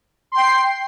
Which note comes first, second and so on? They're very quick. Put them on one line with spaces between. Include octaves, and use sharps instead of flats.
C6 G5 C7